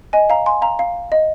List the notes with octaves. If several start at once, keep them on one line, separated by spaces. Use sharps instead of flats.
D#5 G#5
F5 A#5
G#5 C6
F5 A#5
F5
D#5